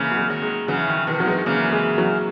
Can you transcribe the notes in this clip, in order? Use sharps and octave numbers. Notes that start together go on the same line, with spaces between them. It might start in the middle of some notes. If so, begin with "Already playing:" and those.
Already playing: C#3 E3 A#3
F#3
G#3
D#3 F#3
G#3
C#3 E3 F#3
D#3
B2 D#3 E3
F#3
G#3
C#3 E3 A#3
G#3
F#3